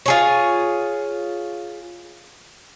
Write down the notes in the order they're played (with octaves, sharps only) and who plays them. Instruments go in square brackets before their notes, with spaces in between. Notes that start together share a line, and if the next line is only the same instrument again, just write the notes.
[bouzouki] F4 G#4 C#5